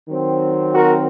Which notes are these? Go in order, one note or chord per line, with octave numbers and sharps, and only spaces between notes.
D#3 F#3 C4
F#4 A#4